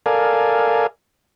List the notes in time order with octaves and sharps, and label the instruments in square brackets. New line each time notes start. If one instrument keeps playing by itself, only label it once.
[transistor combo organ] A4 A#4 D5 F5 G#5